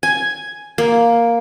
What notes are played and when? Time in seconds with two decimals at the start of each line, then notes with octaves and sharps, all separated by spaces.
0.03 G#5
0.78 A#3